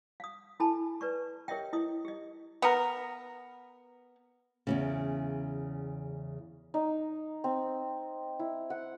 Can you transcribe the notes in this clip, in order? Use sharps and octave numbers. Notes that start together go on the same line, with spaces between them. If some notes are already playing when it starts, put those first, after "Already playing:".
F5 D#6
E4 A4 G#5 A5 B5
B4 D5 C#6
G4 A#4 C#5 D#5 E5 G5
E4 D#5 D#6
G4 D#5
B3 A#4
E2 A#2 C#3
D#4
C4
E4
F#5